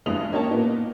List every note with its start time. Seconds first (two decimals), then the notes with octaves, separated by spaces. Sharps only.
0.06 A#1 G2 E3 G#3 D#6 F7
0.32 A#3 C#4 D#4 G4 C#5 A5
0.51 A#2 A#3 B3 D#4